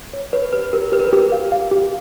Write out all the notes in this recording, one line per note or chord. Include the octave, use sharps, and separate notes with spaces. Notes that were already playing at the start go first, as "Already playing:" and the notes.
C#5
B4 C#5
G4 B4
G4 A#4
G4 B4
A#4
B4
G4
F5
F5
G4